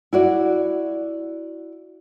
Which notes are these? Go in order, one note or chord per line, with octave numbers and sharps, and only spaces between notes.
E4 F#4 D5